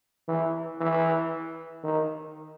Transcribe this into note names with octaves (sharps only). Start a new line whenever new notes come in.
E3
E3
D#3